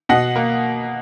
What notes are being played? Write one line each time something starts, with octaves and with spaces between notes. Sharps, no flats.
B2 D#5 F#5
A#3